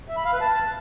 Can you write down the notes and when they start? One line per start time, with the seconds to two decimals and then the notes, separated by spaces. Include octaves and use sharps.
0.08 E5
0.17 B5
0.25 F5
0.33 B4
0.41 A5